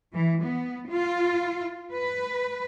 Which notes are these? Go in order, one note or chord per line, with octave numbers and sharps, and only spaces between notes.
E3
B3
F4
B4